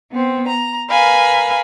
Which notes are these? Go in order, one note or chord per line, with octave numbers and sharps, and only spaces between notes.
B3 C4
A#5
A#4 B4 F5 G#5 B5